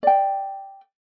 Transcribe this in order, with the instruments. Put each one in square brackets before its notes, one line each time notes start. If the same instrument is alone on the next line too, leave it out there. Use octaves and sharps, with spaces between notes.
[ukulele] D5 G5